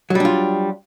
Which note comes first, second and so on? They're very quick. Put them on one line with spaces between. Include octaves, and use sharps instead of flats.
F#3 G3 D4 F4